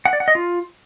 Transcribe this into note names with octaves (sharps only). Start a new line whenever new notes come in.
F#5
D5
F#5
D#5
F4